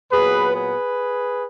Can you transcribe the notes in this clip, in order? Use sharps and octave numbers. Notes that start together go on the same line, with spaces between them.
A#2 F#3 B3 G#4 B4
G#4 B4